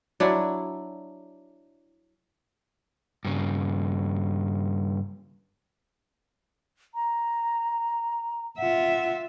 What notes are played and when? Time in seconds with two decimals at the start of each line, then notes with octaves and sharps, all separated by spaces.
0.20 F#3 D4 E4
3.25 G2 C#3
6.95 A#5
8.58 F4 E5 F#5